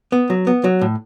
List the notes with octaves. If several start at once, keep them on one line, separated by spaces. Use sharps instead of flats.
B3
F#3
B3
F#3
A2